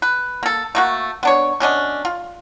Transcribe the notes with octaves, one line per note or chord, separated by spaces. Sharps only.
B4
A#3 A4
A3 A#3 F#4
B3 D4 C#5
B2 C#4 D4 D#5
F4